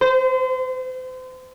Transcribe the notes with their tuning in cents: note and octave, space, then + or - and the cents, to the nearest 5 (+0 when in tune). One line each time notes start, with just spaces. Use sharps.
C5 -35